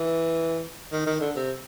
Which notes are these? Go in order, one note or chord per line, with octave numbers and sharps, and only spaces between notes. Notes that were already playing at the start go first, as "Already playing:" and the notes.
Already playing: E3
D#3
D#3
D3
C3